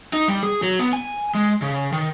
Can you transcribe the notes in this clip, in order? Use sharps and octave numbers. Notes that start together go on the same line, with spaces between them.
D#4
G3
G#4
F#3
B3
G#5
G#3
C#3
D#3